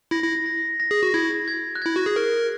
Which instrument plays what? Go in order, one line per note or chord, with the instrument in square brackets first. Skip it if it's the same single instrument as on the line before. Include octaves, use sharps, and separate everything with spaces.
[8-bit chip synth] E4 [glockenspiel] A#6
[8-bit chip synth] E4
[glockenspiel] A#6
A#6
[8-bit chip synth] G#4
F#4
[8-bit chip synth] E4 [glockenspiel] G#6
[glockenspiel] G#6
F#6
[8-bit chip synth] E4 [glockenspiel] G#6
[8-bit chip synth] F#4
G#4
A#4